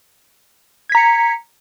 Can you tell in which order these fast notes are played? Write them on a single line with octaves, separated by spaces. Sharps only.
G#6 B6 A#5 C#7